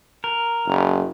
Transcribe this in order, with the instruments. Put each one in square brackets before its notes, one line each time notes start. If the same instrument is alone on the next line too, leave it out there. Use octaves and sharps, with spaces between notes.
[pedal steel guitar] A#4
[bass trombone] F#1